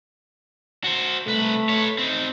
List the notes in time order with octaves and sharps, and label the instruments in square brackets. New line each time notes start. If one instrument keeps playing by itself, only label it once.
[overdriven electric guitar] F#4 C5
[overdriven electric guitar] C2 B4 [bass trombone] A3
[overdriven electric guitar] B4 C#5
C4 D#4